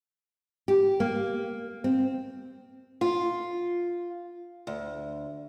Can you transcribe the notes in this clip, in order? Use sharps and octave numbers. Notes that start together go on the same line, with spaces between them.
G4
A#3
C4
F4
D2